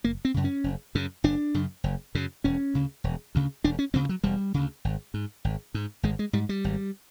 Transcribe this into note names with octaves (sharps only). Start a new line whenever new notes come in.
F#1 A#3
C4
F#2 C#3
C#4
F#1
F#2 C#3
F#1 D4
F#2 C#3
F#1
F#2 C#3
E1 C#4
D2 C#3
E1
D2 C#3
E1 D4
C#4
D2 C#3 C4
F#3
E1 G3
D2 C#3
G#1
G#2
G#1
G#2
G#1 G#3
G#3
G#2 G3
G3
G#1